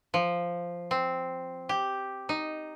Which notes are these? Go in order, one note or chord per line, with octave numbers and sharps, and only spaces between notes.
F3
C4
G4
D#4